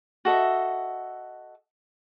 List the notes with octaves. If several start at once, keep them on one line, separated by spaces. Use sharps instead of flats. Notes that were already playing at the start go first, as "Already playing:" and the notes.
F#4 A4 D#5 E5